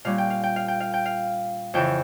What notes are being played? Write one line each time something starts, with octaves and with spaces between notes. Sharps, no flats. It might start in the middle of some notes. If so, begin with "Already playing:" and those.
A#2 G3 C#4 F5
G5
F5
G5
F5
G5
F5
G5
F5
F2 C#3 E3 G5